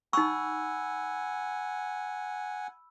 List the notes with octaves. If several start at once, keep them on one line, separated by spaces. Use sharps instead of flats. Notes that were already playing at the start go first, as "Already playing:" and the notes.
D#4 F#5 G#5 B5 C#6 E6